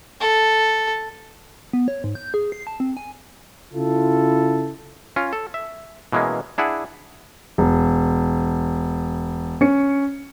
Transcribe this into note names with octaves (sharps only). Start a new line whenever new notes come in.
A4
B3
C#5
G#2
G6
G#4
C7
A5
C4
G#5
C#3 E4 F4 A4
C#4 F4
A4
E5
B2 E3 G#3 A#3 C#4
D4 E4 G#4 F#5
E1
C#4 C#7